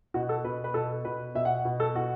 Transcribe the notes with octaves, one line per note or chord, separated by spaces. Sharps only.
B2 F#4
A4
B2 B4
B4
B2 A4
B2 B4
B2 E5
F#5
B2
A4
B2 F#4